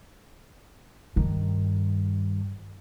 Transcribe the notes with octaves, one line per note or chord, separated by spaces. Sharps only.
G2 D#3